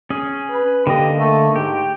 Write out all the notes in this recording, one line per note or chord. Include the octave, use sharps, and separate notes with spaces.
C#4 G#4
B4
D3 A#3 G4 D#5
A3
G#2 G4